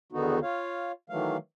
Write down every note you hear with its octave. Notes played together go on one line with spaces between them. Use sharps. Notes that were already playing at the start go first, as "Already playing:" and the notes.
E2 D3 D#3 B3 D#4 F#4
F4 C#5 F5
D#3 E3 F#3 A3 F5